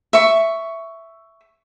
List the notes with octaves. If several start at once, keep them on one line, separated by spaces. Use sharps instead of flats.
E5 C#6